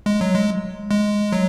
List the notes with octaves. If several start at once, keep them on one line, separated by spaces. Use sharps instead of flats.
G#3
F#3
G#3
G#3
F#3